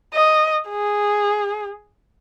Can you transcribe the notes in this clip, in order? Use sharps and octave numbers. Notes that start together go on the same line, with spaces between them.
D#5
G#4